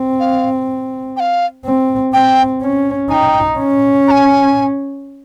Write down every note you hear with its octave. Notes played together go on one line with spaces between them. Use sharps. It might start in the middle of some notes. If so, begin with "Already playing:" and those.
Already playing: C4
F5
G5
F5
C4
C4 G5
C#4
D#4 G5 G#5
C#4
A#5
G#5